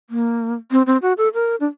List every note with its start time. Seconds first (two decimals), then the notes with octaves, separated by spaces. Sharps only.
0.10 A#3
0.71 C4
0.86 C4
1.02 F#4
1.17 A4
1.34 A#4
1.60 D4